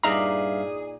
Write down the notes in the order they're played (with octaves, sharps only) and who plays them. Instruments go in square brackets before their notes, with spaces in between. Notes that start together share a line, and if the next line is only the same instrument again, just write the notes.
[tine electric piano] G2 E5 F5 [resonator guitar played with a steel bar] A#2 D#4 D5 [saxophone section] G#4 [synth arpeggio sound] A#5